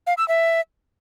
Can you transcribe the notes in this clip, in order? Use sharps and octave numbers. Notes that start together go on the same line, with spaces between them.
F5
E6
E5